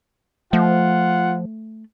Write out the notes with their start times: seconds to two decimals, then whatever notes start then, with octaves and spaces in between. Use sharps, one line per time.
0.53 F3 A3 F4 F#5